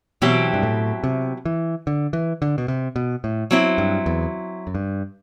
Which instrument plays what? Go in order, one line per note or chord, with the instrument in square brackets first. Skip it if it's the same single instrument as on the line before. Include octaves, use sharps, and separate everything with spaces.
[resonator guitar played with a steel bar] B2 F#3 C4 E4 G4 [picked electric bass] E3
[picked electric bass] G2
A2
C3
E3
D3
E3
D3
B2
C3
B2
A2
[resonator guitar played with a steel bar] F#3 C4 E4
[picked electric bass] G2
E2
F#2
G2